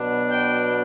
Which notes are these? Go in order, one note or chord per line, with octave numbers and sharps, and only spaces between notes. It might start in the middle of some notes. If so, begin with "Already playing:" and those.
Already playing: B2 F#3 B3 D4
G5